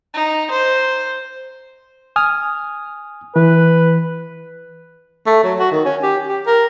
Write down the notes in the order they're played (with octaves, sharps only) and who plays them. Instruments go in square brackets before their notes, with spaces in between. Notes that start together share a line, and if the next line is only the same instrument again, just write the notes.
[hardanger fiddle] D#4
C5
[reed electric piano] G#5 D#6 F6
[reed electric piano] E3 [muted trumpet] B4
[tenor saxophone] A3
F#3
F#4
D#3
C#4
G4
G4
A#4